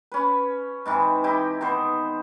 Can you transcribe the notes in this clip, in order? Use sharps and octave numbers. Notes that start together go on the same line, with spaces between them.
C#4 B4
G#2 C3 E3
D#4 E4 G4
D#3 B3 C5